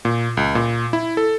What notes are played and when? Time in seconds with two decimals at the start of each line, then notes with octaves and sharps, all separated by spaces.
0.05 A#2
0.37 C#2
0.55 A#2
0.93 E4
1.17 A4